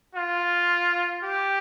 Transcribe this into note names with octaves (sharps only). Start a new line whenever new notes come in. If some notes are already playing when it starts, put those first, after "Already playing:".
F4
G4